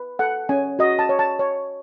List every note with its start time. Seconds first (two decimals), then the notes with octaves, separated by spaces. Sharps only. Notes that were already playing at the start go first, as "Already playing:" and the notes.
Already playing: B4
0.19 A4 F#5
0.49 C#4 G#5
0.79 F#4 D#5
0.99 A5
1.09 C#5
1.19 A5
1.39 C#5